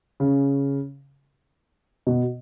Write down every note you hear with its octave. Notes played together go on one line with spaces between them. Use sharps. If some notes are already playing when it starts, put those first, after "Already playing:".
C#3
B2